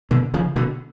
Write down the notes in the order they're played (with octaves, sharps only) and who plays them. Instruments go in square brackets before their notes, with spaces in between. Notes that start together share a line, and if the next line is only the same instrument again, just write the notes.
[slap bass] B2 D3
C#3 F3
B2 D3